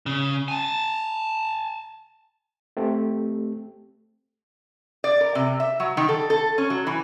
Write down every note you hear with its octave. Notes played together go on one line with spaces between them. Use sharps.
C#3
G#5 A5
A3 C4 G4
D5
A#4
C3
E5
F#3
D#3
A4
A4
C#4
F#3
E3